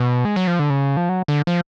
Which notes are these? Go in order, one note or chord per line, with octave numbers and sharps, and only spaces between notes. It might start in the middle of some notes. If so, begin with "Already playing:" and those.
Already playing: B2
G#3
F#3
F3
D3
C#3
F3
F#3
D3
F3